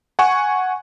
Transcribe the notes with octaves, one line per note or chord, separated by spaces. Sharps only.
F#5 G#5 C#6